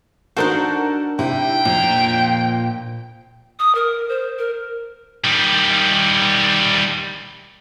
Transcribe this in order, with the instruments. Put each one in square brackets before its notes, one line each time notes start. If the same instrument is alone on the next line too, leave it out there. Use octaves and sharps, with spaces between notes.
[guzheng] D4 D#4 C5 [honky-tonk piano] F#4 A4 A#4
[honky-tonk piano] C3 E4 [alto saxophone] G5
[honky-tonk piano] F2 [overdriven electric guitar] A#2 A#5
[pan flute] D#6
A#4
C5
A#4
[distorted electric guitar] D#3 G3